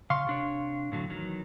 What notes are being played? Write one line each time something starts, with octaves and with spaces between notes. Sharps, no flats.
C#3 F5 C6 C#6
C3 D4 C#5
A2 D3 F#3
E2 D#3 F#3